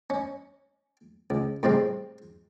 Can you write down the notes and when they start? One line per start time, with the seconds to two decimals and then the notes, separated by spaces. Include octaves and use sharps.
0.10 C#4
1.30 C#2
1.63 A2 C3 G3 G#3 C4